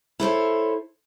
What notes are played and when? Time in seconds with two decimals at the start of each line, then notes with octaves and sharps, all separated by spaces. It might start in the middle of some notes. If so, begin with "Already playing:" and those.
0.20 E4 A4 C5 C#5